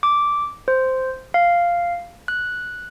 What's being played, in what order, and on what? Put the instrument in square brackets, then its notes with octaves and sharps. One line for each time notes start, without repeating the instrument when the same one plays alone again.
[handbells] D6
C5
F5
F#6